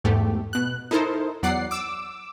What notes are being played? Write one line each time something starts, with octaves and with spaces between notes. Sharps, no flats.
E2 G#2 A3 G4
B2 F#6
D#4 E4 A4 A#4 C5
E2 F#3 D5 F#5 C7
D6 E6